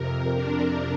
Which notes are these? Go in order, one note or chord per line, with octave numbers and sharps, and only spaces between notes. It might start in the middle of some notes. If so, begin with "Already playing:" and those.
Already playing: F2 C3 A#4
D4